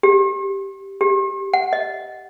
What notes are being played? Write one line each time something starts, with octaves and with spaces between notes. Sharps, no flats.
G4
G4
F#5
D#5